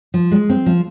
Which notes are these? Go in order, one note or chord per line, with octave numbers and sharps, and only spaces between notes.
F3
G#3
C4
F3